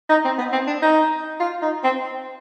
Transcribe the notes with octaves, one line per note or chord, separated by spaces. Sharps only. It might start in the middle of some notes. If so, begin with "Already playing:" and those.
D#4
C4
B3
C4
D4
D#4
F4
D#4
C4